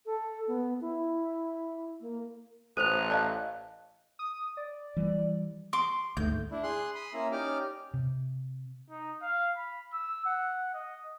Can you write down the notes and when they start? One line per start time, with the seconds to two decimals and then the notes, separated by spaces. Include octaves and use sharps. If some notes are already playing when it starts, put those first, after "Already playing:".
0.06 A4
0.48 B3
0.81 E4
2.01 A#3
2.77 A1 A4 C5 F#6 D#7 F7
3.11 D5 D#5 F5 A5
4.19 D#6
4.57 D5
4.97 E3 G3
5.73 C6 D6
6.17 D2 G#2 A3 G6
6.51 D4 E4
6.63 G#4 C6 F#6
6.95 B5 C6 D#6
7.14 A#3 C#4 E4 E5 A#5
7.32 C#4 D#4 G4 D5 D6 F6
7.94 C3
8.90 D#4
9.22 F5
9.56 B5
9.93 E6
10.26 F#5
10.74 D#5